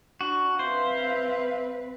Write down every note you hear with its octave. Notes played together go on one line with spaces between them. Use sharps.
D4 F#4
C4 B4 C5 E5 F5